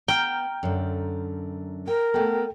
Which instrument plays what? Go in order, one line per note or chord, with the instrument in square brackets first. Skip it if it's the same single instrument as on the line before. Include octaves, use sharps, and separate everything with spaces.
[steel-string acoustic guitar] B3 [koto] G5 [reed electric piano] A#5 F6 G6
[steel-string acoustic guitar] F#2 D3
[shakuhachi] A#4 [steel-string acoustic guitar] G5
[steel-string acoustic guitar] A3 B3 [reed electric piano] A4 G5